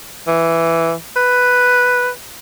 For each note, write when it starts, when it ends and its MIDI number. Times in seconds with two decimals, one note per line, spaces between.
0.28 0.93 52
1.16 2.10 71